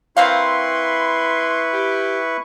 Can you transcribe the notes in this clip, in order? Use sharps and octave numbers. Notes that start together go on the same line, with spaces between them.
A#3 C4 E4 B4 F5 C6 C#6
G4